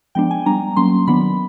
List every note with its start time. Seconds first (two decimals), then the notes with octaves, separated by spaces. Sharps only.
0.15 F3 G#3 B3 D4 G5
0.31 G#5
0.46 G3 B3 D4 A#5
0.76 F#3 A#3 C#4 C6
1.07 D#3 F#3 B3 D4 B5